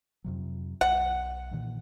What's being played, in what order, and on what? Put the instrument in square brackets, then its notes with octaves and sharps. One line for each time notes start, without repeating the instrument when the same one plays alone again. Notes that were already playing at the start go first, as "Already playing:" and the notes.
[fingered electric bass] F2 C3 F#3
[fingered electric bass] B1 [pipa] F#5
[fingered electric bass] A#2 D#3 E3